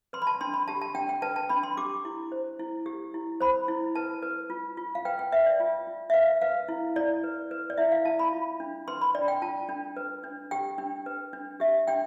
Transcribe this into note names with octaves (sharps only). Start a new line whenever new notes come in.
B4 C6
B5
A5
D4 C6
B5
G4 A5
A5
D4 G5
G5
B4 A5
A5
D4 B5
C6
G4 D6
E4
C5
E4
G4
E4
C5 B5
E4
B4 A5
B4
F4
F4
F5
B4 G5
G5
B4 E5
D5
F4
F4
E5
B4 F5
B4 F5
E4
E4 D5
B4
B4
D5
E4 E5
F5
E4 A5
B5
F4
D4
B4 C6
B5
D4 D5
G5
F4 A5
D4
B4
D4
G4 G5
D4
B4
D4
G4 E5
D4 G5